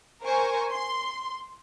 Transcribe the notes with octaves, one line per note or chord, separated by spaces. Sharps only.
A#4 C5 G#5 C#6
C6